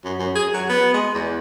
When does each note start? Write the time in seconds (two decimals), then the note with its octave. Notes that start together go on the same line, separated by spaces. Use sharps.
0.04 F#2
0.19 F#2
0.35 G#4
0.54 F#3
0.69 B3
0.94 G#3
1.15 E2